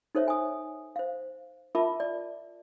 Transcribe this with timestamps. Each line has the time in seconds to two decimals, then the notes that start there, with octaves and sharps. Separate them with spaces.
0.15 D#4 A4 C5 C#5 E5
0.28 G#5 D#6
0.96 C5 F5
1.75 F4 A#4 E5 A5 B5 D6
2.00 D5